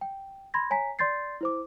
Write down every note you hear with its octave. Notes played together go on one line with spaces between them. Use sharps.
G5
B5 C6 G#6 A#6
C#5 G#5 A#5 B6
D5 C6 G6 A6 C7
E4 C5 D6